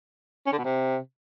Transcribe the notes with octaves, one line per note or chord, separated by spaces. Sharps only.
C#4
D3
B2
C3